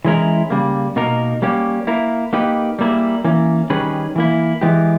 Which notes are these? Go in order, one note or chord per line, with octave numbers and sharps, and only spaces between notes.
E3 G#3 C#4 E4 A#4
C#3 G3 A#3
B2 A#3 D#4 A#4
G3 A#3 C#4 G4
A#3 E4 A#4
A#3 D#4 G4 B4
G3 A#3 E4 G#4
E3 A#3 C#4
D#3 G3 C#4 G#4 B4
E3 A#3 E4
E3 G#3 B3 G4